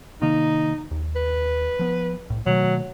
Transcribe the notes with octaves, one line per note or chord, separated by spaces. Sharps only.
C3 D#3 A#3 D#4
D#2
B4
F3 B3
C2 A2
B2 D#3 F#3 A3